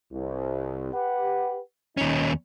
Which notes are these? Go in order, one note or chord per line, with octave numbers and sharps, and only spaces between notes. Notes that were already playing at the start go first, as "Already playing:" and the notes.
C2
G4 B4 F#5
D#2 C#4 D#4